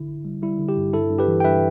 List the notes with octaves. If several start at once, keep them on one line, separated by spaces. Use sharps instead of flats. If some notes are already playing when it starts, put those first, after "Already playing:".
Already playing: A1 D3 E4
G1
G3
G3 E4
D3
G4
G2
G2 E4 A4
G2
G4 B4
E3
G5
G2 B4 E5